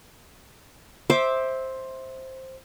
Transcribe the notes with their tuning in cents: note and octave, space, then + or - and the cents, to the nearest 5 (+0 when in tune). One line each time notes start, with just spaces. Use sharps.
C5 +10 E5 -15 D6 +0